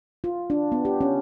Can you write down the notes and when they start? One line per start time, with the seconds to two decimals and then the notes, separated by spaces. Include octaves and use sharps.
0.24 F4
0.50 D4
0.72 B3
0.85 G4
1.01 C#4